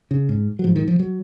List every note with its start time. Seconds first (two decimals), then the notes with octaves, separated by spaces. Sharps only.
0.11 C#3
0.29 G#2
0.59 F#3
0.64 G#2 F3
0.76 D#3
0.88 F3
1.00 F#3